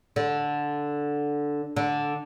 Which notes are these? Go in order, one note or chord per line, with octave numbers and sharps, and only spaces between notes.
D3
D3